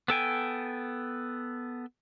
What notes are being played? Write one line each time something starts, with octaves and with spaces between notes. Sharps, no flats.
B3 A4 G5 G#5